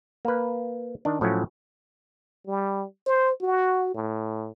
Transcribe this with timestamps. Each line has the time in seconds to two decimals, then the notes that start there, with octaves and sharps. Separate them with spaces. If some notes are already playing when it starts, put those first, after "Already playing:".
0.25 A#3 B4
1.05 D#3 D4
1.21 A2 F3 F#3 A3 C#4
2.47 G3
3.06 C5
3.41 F#4
3.94 A2